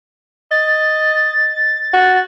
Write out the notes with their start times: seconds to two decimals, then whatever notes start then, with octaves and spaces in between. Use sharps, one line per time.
0.51 D#5 A6
1.94 F#4